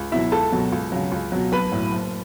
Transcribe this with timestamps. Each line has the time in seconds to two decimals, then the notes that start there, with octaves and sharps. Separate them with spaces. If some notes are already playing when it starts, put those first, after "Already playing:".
Already playing: C#2
0.12 B2 F#3 E4 E5
0.32 C#2 A4 A5
0.52 B2 F#3
0.72 C#2
0.92 C#3 F#3
1.12 C#2
1.32 B2 F#3
1.52 B1 B4 B5
1.72 A2 F#3
1.92 F#1